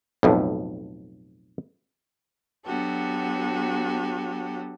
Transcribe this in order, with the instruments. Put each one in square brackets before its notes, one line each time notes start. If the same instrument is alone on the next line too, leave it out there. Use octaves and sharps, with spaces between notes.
[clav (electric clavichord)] B1 F2 A2
[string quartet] F#3 B3 D4 F#4 G4 A4